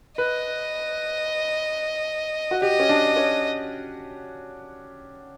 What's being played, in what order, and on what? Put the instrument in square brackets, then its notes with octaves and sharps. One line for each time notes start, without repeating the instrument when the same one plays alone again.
[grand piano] B4 [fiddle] D#5
[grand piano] F#4
[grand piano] G4 [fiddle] D#5
[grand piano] C#4
D4
C#4